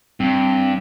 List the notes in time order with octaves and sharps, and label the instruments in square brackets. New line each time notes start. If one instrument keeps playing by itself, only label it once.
[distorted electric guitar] G2 [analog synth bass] C4